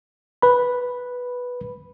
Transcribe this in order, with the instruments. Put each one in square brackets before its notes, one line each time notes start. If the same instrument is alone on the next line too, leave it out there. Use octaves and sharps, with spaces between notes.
[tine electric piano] B4 B5